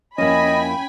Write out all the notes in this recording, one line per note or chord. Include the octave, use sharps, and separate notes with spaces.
F2 A#3 C#4 E4 D#5 G5 G#5 B5